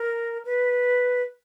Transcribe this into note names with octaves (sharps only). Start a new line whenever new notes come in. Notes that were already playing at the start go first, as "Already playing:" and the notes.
Already playing: A#4
B4